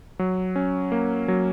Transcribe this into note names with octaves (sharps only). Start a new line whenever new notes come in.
F#3
C#4
A#3
F#3